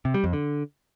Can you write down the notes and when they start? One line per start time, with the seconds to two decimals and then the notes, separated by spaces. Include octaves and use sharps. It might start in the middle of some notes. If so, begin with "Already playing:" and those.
0.05 C3
0.14 G3
0.24 F2
0.33 D3